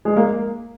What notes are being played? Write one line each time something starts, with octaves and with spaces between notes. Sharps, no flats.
G#3
A#3